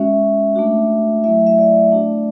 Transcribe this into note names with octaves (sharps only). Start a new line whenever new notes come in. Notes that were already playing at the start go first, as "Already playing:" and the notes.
Already playing: G#3 C#4 F#4 E5
A3 D4 F#4
F#3 A3 E4 E5
E5
D5
A3 D4 F#4